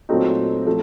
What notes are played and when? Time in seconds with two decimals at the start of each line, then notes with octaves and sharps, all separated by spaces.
0.09 A#2 F#3 A3 C4 D#4
0.66 F3 A3